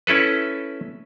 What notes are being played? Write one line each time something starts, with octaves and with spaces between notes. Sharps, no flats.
C#4 E4 A4 B4